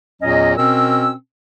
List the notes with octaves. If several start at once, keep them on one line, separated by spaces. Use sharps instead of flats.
E2 A#2 F#3 C#4 D#5
B2 C4 C#4 A#4 E6